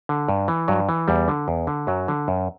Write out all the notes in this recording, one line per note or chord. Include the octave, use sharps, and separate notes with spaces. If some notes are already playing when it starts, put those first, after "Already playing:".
D3
G2
E3
G2 F#3
E3
E2 G3
D3
E2
D3
F#2 F#3
D3
F#2